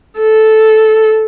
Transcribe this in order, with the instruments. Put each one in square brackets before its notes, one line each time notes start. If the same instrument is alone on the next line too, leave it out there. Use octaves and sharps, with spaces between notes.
[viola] A4